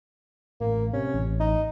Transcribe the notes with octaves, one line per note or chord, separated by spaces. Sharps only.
A1 A#3
C3 C#4
A1
D#4